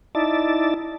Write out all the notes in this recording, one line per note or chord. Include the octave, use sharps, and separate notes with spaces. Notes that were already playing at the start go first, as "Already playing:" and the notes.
D#4 E4 D5 A5